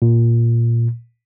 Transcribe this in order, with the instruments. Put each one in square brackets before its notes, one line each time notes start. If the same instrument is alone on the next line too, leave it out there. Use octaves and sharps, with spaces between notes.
[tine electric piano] A#2